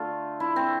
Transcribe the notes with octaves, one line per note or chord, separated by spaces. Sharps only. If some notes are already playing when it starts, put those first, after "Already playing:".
Already playing: D3 A3 F4
E4
C4